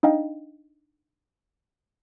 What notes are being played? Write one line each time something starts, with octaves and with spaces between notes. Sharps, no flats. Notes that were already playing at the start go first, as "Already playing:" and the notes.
D4 D#4 D#5 F5 G5